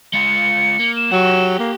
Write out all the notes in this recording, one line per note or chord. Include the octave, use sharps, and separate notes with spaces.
G#3 F4 C#7
A#3
E7
F#3 G4 F#5
A#3